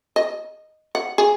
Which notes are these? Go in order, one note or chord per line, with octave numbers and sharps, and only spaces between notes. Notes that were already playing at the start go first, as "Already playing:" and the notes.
D#5
F#5
G#4